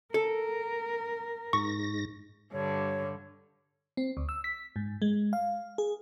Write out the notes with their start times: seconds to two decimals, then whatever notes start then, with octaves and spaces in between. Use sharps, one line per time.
0.14 A4 A#4
1.53 G#2 C#6 A#6
2.52 G2 D3 C#5
3.97 C4
4.17 D2
4.29 E6
4.44 B6
4.76 G#2
5.02 G#3
5.33 F5
5.78 G#4